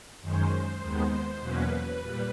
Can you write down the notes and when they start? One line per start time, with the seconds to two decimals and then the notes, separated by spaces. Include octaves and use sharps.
0.22 F#2 D#3 G#3 C#4 C5
0.81 D#2 D#3 G#3 B3
1.40 E2 B2 F#3 A#3 C#4 B4
2.00 A#2 G3